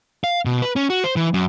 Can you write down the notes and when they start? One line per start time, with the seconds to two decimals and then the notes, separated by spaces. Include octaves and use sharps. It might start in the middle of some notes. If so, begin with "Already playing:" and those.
0.24 F5
0.45 B2
0.62 B4
0.76 C#4
0.90 F#4
1.04 C5
1.16 E3
1.34 F#2